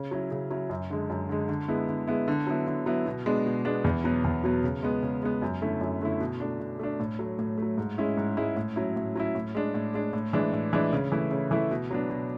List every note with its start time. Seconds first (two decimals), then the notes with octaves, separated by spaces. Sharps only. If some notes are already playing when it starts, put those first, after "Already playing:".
Already playing: C#3
0.11 F#3 C#4 E4
0.31 C#3
0.50 F#3 C#4 E4
0.70 F#2
0.90 D3 G#3
1.10 F#2
1.29 D3 G#3
1.49 D3
1.68 G#3 B3 E4
1.88 D3
2.07 G#3 B3 E4
2.28 D3
2.47 F#3 B3 E4
2.67 D3
2.86 F#3 B3 E4
3.06 B2
3.26 G#3 B3 D4
3.46 B2
3.65 G#3 B3 D4
3.84 E2
4.04 B2 F#3 B3
4.24 E2
4.44 B2 F#3 B3
4.63 C#3
4.83 G#3 B3
5.02 C#3
5.23 G#3 B3
5.42 F#2
5.61 D3 A3 C#4 E4
5.81 F#2
6.01 D3 A3 C#4 E4
6.20 B2
6.40 A3 D4
6.60 B2
6.79 A3 D4
7.00 A2
7.19 F#3 A3
7.39 A2
7.58 F#3 A3
7.78 G#2
7.98 G#3 C#4 E4
8.17 G#2
8.37 G#3 C#4 E4
8.56 A2
8.76 F#3 C#4 E4
8.96 A2
9.15 F#3 C#4 E4
9.35 A2
9.55 G#3 D4
9.74 A2
9.94 G#3 D4
10.13 A2
10.33 E3 G#3 D4
10.53 A2
10.73 E3 G#3 D4
10.93 C#3
11.12 E3 A3 E4
11.31 C#3
11.51 E3 A3 E4
11.71 B2
11.91 F#3 B3 D4
12.10 B2